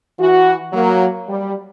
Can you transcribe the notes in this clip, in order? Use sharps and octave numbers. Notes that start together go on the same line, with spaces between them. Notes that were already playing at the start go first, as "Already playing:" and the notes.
E3 F#4
F#3 A#3
G3